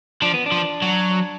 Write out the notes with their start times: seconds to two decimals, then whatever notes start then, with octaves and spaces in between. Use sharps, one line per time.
0.22 F3 D4
0.34 B3
0.46 D4
0.52 F3
0.82 F#3